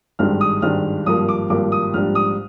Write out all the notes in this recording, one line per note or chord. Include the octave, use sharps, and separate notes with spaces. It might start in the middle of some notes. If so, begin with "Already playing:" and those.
G#1 G2 D#3 G#3 D4 F6
D#6
G#1 G2 D#3 G#3 D4 F6
G#1 G2 F3 A#3 D#6
D6
G#1 G2 F3 A#3 D6
D#6
A#1 G#2 G3 D4 F6
D#6